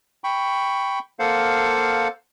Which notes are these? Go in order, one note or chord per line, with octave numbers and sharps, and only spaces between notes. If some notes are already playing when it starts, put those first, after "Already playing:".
G5 B5 C#6
A#3 A4 C5 F5 F#5